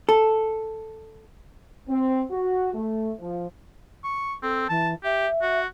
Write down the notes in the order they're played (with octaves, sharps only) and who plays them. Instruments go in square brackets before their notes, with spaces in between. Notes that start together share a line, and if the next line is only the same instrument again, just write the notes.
[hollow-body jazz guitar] A4
[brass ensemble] C4
F#4
A3
F3
[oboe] C#6
[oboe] C4 [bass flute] A4
[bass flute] E3 [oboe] A5
[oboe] G4 [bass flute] E5
[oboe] F#4